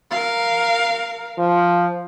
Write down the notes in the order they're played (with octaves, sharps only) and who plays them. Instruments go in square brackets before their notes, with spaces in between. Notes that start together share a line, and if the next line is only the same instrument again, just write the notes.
[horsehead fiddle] A#4 F5
[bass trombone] F3